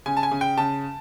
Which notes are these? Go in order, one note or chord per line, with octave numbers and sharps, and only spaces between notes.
C#3 G#5
A5
G#5
C#3
G5
C#3 A5